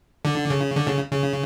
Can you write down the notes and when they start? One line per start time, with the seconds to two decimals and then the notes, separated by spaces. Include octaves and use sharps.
0.25 D3
0.50 C#3
0.76 D3
0.87 C#3
1.13 C#3